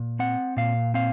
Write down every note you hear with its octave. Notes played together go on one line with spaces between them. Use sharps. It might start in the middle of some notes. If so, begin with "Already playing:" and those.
Already playing: A#2
C4 F#5
A#2 F5
C4 F5